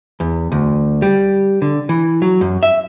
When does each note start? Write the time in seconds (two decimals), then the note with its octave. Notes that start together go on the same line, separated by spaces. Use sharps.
0.20 E2
0.52 D2
1.02 G3
1.62 D3
1.89 E3
2.22 F#3
2.41 F#2
2.63 E5